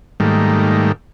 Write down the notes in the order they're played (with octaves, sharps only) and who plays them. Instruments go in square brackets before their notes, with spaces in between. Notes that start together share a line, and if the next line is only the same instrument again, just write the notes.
[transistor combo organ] G#2 D#3 G3 A3 A#3